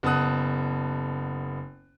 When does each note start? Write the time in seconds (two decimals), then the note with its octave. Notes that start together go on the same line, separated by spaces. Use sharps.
0.03 F#1 B3 A5 D#6 F#6